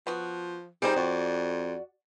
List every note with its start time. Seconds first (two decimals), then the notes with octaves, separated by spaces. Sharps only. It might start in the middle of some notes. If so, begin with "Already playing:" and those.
0.07 F3 B3 F#4
0.82 G3 C4 D#4 F4 G4 G#4 C5
0.96 F2 F#4 D5